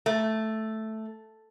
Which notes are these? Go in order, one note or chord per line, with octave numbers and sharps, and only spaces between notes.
A3